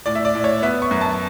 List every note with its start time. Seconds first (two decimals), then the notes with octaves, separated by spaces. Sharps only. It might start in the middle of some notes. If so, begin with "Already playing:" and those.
0.06 A2 D5
0.15 E5
0.25 D5
0.35 A2
0.44 C#5
0.62 B3 E5
0.82 C#6
0.91 F#2
1.01 A5